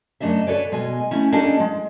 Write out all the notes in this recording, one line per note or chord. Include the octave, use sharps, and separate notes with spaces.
F#2 C#3 A3 D4 D#5 E5
A4 B4 C#5 D5
B2 G#3 D#5 G#5
A3 C#4 E4
A#3 C#4 D4 G4 A4 D#5
G#3